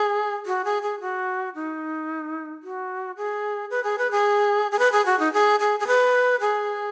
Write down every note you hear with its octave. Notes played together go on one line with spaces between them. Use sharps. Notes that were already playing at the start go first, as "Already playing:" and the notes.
Already playing: G#4
F#4
G#4
G#4
F#4
D#4
F#4
G#4
B4
G#4
B4
G#4
G#4
B4
G#4
F#4
D#4
G#4
G#4
G#4
B4
G#4